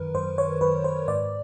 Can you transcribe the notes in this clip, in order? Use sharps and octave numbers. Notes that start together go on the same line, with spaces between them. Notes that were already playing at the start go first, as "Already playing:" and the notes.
Already playing: F#2 D#3 A#4 B4
F#2 C5
C#5
F#2 B4
C5
G#2 D5